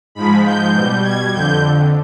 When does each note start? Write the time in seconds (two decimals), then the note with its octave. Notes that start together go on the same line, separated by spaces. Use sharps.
0.15 G#2 F3 G#3 B5
0.45 G6
0.74 B2 G3
1.04 G#6
1.33 F2 D3 G6